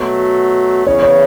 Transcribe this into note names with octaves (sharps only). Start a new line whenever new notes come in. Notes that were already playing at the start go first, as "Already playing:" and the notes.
Already playing: B2 F#3 A3 F#4
E2 C#3 E3 C#5
C#5